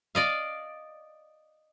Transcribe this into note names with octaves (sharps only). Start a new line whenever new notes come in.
D5 D#5 F5